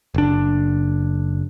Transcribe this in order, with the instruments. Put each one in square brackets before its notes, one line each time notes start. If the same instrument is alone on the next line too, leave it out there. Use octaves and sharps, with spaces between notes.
[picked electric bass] F#1 D4